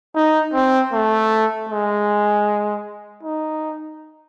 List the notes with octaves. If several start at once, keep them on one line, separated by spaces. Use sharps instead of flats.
D#4
C4
A3
G#3
D#4